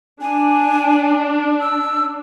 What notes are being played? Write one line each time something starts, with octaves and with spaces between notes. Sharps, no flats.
D4 G#5
E6